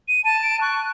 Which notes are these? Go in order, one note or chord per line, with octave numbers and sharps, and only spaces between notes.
D#7
A5 D#7
D7
C#6 F#6